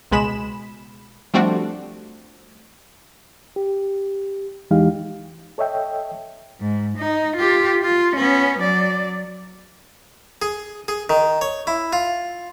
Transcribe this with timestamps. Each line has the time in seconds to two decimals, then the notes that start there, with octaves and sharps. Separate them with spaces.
0.11 C#2 B2 G#3 B5 E7
1.34 F3 G3 A3 C4 D4 F#4
3.56 G4
4.71 E2 E3 G#3 D#4 G4 F5
5.58 A4 C#5 D#5 E5 G5
6.60 G#2
6.98 D#4
7.36 F4 G4
7.83 F4
8.16 B3 C#4
8.59 F#3 D5
10.42 G#4
10.88 G#4
11.10 D#3
11.41 C#5
11.67 E4
11.93 F4